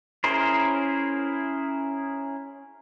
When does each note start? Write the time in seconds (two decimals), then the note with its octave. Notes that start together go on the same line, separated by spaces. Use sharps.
0.24 C#4 E4 G#4 A#4 C5